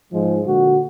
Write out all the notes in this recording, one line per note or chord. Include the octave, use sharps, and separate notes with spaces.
G#2 F3 G#3
A#2 D3 F#4